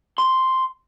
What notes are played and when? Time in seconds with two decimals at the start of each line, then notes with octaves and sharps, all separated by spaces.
0.18 C6